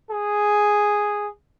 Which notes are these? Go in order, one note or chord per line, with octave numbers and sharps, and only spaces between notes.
G#4